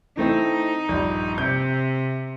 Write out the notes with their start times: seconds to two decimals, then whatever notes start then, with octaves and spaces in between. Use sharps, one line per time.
0.17 E3 A3 C4 D#4
0.89 A#1 G2
1.38 C3 G6